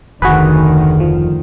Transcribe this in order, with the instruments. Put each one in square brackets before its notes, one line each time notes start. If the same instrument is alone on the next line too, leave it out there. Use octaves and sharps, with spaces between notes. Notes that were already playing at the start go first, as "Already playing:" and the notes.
[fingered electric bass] F1 [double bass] D2 D#3 [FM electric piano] F#4 G#4 B4
[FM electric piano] F3